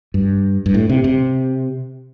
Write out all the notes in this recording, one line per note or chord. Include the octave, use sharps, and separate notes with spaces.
G2
G2
A2
C3
C3